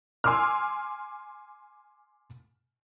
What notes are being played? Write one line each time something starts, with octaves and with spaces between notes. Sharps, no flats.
G#5 C6 D6 E6 F6